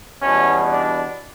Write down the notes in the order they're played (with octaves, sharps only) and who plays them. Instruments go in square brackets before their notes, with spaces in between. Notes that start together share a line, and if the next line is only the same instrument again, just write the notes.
[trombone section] E2 B2 G3 C#4
D4